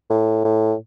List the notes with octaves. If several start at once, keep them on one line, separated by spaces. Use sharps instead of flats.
A2
A2